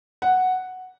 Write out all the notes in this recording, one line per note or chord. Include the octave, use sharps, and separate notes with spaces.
F#5